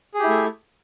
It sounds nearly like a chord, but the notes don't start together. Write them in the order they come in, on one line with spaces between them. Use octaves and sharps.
G#4 G4 E4 A3